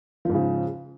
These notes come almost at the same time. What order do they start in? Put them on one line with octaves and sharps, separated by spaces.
F3 G#2 C#3